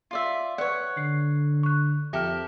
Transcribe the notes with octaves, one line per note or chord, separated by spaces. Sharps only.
F4 D5 E5
B4 C#5 D5 F#5
D3 C7
C#6 F#6
F2 G4 A4 A#4 E5 F6